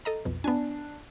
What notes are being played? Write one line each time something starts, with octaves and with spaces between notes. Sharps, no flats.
A4 D#5 A#5
B1 F2 B2
B3 D4 G#5